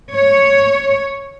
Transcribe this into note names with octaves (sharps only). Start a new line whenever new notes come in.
C#5